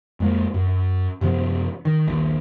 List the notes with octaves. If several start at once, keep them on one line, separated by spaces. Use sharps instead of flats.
F2 G#3 A#3
F#2
F#2 C3 F3 B3
D#3
A#1 D#2